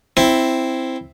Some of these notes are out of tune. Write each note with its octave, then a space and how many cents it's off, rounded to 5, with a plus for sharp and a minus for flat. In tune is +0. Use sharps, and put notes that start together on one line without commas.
C4 +0 E4 +0